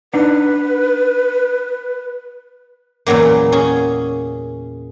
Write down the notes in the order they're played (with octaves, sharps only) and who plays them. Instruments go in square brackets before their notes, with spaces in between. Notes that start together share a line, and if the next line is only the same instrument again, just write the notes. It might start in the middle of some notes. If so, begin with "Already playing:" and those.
[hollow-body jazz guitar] D4 D#4 F#5 [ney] B4
[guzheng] E2 A#2 C#3 F#3 A#3
C#4 G#4